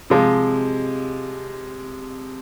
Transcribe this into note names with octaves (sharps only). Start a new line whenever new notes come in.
C3 F3 G#3